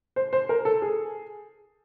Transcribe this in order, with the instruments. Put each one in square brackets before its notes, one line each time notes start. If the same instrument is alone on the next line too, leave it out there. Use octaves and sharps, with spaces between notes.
[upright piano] C5
C5
A#4
A4
G#4